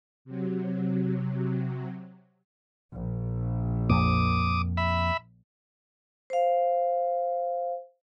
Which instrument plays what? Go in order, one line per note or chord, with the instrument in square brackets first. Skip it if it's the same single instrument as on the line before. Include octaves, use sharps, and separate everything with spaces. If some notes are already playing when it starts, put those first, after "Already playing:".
[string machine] C3 F#3
[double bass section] A#1
[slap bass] F2 A#3 [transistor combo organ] D6 D#6
[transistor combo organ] E5 B5
[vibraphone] C5 F5